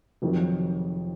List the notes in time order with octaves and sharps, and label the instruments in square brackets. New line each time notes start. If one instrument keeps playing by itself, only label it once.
[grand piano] F1 F2 D#3 F#3